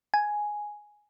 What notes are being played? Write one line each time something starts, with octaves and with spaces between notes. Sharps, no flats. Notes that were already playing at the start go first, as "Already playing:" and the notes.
G#5